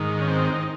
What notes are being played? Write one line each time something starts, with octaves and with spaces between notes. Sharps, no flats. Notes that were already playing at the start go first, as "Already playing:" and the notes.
Already playing: G#2 D#3
C#4
C4
D#4